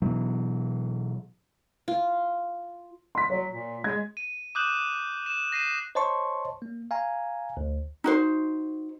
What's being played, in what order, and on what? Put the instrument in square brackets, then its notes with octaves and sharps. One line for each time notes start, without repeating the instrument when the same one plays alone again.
[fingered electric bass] B2 E3 F#3
[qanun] F4
[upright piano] C6 B6
[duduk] F#3 [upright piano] C#5
[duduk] A#2
[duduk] G#3 [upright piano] G#6
[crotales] D#7
D6 D#6 F#6 G6 E7 F#7
E7
A#6 C7 D#7 E7
[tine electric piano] C5 C#5 D#5 A5 C6 C#6
A#3
F5 G#5 A#5
D2
[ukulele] D#4 F#4 C5